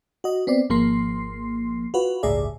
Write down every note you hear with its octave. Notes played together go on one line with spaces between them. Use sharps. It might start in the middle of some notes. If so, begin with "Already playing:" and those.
F#4 D#5
B3 C4 D5
G#1 F3 A#3 C6 C7
F4 F#4 B4
G1 C#2 A2 G#4 D5 E5